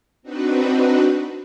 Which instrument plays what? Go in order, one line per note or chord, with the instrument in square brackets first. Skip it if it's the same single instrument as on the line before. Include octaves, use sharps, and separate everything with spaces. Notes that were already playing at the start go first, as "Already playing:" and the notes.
[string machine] C4 D4 D#4 F#4 B4